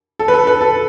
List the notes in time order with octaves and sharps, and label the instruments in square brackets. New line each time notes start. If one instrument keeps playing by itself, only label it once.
[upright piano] A4
B4
A4
B4
A4